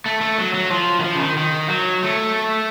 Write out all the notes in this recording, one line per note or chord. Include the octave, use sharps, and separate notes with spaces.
A3
A3
F#3
F#3
F3
D#3
F3
C#3
D#3
D#3
F#3
A3